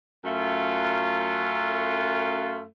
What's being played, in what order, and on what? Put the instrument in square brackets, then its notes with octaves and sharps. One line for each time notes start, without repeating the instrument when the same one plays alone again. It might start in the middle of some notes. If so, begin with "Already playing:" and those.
[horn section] F#2 A3 F4